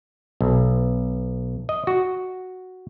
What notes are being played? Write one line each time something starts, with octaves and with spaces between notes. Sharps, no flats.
B1
D#5
F#4